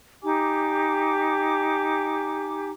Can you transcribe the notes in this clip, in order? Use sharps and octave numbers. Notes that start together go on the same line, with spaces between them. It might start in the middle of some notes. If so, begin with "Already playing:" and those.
D#4 G4 G#5 D6